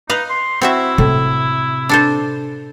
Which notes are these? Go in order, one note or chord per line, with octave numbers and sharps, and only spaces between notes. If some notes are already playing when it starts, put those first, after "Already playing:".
D#4 B4 D#5 F5
C6
C4 E4 F#4 E5
A2 C3
D4 A4 C5